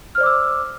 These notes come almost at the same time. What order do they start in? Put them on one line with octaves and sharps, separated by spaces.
F6 C5 D5 D6 E6